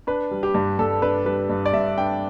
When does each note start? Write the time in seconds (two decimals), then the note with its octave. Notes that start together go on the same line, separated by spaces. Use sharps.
0.07 D4 B4
0.31 G3
0.43 G4
0.54 G2
0.79 G2 A4
1.02 D4 B4
1.26 G3 B4
1.49 G2
1.66 D5
1.73 G2 E5
1.97 D4 G5